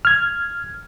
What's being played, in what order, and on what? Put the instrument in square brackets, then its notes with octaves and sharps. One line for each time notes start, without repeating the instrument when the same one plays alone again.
[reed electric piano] F6 G#6